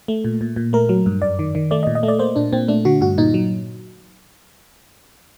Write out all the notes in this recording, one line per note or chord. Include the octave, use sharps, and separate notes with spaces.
A3
A#2
A#2
A#2
A3 A#4
F#3
G2
F#2 D5
D#3
D#3
A3 D5
D#5
A#2
D#5
A3
D5
A#3 C5
A#2 D4
A#2 C4
A3 D4
D3 F#4
G2 F#4
A#2 D#4
F#3